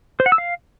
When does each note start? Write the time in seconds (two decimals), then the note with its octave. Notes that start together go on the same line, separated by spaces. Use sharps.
0.20 C5
0.26 F#5
0.32 E6
0.38 F5